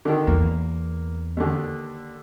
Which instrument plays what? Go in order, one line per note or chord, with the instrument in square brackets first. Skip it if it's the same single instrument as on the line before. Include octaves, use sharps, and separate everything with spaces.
[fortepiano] D3 D#3
[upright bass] E2 [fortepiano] A#3
[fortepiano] D#2 D3